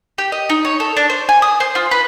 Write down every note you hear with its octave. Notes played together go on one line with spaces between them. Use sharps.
G4
D#5
D#4
C#5
A4
D4
C5
G#5
D#6
C5
F4
B4